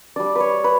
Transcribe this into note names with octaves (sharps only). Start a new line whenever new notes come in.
G3 D4 D5
B4 C#5
B4